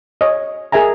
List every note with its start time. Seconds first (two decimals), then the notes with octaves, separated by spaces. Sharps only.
0.21 C#5 D#5
0.72 G#4 A#4 E5 G#5 A#5